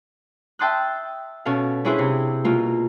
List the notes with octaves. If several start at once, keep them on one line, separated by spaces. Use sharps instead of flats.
E5 G5 A5 C6 D#6 F#6
B2 C#4 A4 F5
C#4 D4 E4 G#4 B4 C5
C3
B2 A#3 F4